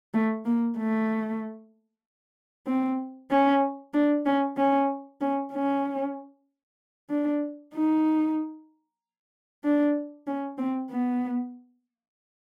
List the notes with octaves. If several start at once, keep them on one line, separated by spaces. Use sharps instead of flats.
A3
A#3
A3
C4
C#4
D4
C#4
C#4
C#4
C#4
D4
D#4
D4
C#4
C4
B3